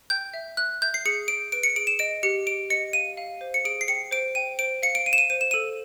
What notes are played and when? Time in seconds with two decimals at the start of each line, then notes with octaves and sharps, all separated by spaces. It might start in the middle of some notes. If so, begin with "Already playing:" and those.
0.10 G5 G6
0.34 E5
0.57 E5 F#6
0.82 E5 G6
0.94 C7
1.05 G#4 C#7
1.28 G#4 D7
1.52 B4 D7
1.63 C#7
1.76 G#4 D7
1.87 E7
1.99 D#5 D7
2.23 G4 C#7
2.46 G4 D7
2.70 D#5 C#7
2.93 F5 D#7
3.17 F5
3.41 C5
3.54 C#7
3.65 G#4 D7
3.81 C7
3.88 G5 C#7
4.11 C5 D7
4.35 G5 D#7
4.59 C5 D7
4.83 F5 C#7
4.95 D7
5.06 F5 D#7
5.13 E7
5.18 D#7
5.30 C5 D#7
5.41 E7
5.51 A4 D#7